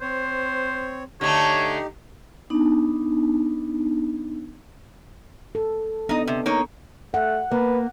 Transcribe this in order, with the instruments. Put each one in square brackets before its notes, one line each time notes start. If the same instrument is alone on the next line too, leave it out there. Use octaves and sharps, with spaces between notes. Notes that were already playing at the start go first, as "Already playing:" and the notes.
[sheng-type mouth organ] C4 C#5 [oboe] C5
[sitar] D3 A3 [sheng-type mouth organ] D#4 G4 [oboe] C#5
[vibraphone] B3 D4 D#4
[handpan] A4
[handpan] B3 D4 [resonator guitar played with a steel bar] D#4 D#5
[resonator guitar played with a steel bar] C3
A#3 D#4 C#5
[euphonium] A3 [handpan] F#5
[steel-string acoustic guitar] A#3 [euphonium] B4